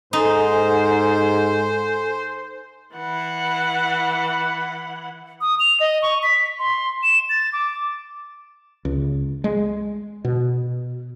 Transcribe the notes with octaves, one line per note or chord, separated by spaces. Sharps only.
G#2 D#4 A4 C5 G#5
E3 F#5
D#6
F7
D#5
C#6
B6
C6
E7
A6
D6
C#2
G#3
B2